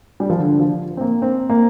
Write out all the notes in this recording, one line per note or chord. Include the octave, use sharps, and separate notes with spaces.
G3
F3
D3
F3
C4
A#3
C4
A#3